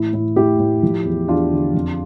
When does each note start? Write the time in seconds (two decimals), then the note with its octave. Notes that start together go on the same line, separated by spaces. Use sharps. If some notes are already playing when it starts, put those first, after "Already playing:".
Already playing: A2 E3 E4
0.13 A2 E4
0.36 A2 E4 G4
0.60 A2
0.83 F3
1.05 E2
1.28 E2 D4 F4
1.51 D3
1.74 F2